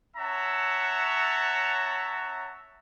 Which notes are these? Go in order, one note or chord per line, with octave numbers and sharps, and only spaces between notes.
C#4 C#5 E5 F#5 A5 A#5